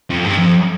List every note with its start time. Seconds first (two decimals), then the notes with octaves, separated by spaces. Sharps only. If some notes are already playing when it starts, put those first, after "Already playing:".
0.10 F2
0.24 G2
0.38 F2